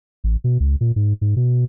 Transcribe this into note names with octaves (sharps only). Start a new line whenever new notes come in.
A1
B2
C#2
A#2
G#2
G#2
B2